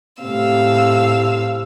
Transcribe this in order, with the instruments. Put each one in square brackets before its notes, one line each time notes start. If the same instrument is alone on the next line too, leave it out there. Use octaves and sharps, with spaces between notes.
[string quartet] A2 C3 F5 E6